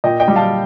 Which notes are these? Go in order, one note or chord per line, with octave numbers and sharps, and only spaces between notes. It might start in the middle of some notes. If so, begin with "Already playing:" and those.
A#2 D#5 G5
D#5 G5
G3
F5 A5